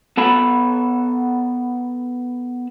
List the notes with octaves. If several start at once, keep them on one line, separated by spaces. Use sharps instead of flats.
B3 A4 A5 B5